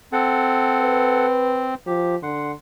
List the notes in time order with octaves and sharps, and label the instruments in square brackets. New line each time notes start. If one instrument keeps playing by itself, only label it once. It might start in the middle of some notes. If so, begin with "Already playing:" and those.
[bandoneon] C4 [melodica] A4 F#5
[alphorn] B4
[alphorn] F3 [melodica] G4
[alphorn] D3 [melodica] F#5 C6